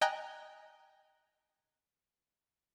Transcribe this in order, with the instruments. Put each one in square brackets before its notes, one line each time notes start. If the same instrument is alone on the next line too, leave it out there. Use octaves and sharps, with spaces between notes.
[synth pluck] D#5 G5 G#5 A#5 F#6 A#6